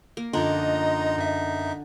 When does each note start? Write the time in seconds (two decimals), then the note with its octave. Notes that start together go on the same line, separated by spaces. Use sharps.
0.17 A#3
0.33 F#2 D3 F3 D4 D#4 D#5 A#5 C6
1.18 F#2 E5